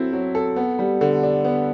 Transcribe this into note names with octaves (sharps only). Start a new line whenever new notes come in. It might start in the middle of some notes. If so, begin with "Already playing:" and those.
Already playing: F#3 C4 E4 A4
F#3
A4
B3
G3
D3
D4
B3